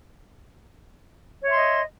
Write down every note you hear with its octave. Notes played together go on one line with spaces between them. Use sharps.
C#5 D#5 E5 C6